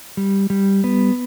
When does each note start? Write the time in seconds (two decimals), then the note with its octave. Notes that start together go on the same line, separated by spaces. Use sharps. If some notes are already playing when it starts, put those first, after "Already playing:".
0.17 G3
0.50 G3
0.84 B3